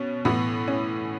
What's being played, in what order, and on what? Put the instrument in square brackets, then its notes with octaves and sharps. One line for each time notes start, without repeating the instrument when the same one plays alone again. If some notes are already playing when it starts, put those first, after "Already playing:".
Already playing: [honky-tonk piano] B2 C#4
A2 E3 B3
C#4